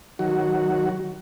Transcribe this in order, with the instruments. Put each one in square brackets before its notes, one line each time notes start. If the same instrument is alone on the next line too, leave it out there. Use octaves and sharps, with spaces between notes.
[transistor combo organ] D#3 F#3 F#4